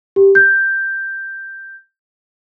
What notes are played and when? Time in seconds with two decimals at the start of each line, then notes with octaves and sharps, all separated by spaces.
0.16 G4
0.35 G6